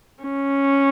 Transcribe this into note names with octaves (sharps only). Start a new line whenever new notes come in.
C#4